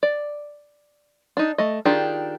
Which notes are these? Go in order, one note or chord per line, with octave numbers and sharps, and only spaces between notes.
D5
D4 D#4
A3 D#5
D#3 D4 F4 G4 G#4